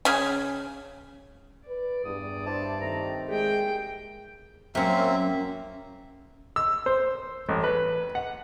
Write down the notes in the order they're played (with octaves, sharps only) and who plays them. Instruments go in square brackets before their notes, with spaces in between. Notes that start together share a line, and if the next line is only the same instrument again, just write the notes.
[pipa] C#3 G#5
[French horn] B4 [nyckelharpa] D5
[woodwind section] E2 [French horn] G2 [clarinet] D#6
[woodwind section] D4 E4 C5 [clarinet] A5
[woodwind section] D#3 A3 C4 [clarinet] A#5
[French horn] G#3 [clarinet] G4 [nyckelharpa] G#4 G5
[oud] F#2 C#4 [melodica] A#3 C4 E5
[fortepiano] E6
C5
A1
B4
F#5